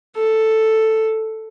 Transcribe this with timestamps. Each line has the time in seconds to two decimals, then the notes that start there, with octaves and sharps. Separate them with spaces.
0.16 A4